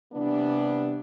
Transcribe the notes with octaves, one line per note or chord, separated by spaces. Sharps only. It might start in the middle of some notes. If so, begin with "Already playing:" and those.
C3 E3 G3 B3 D4